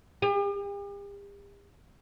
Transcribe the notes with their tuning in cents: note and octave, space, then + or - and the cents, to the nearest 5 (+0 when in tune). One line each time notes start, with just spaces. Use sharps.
G4 +45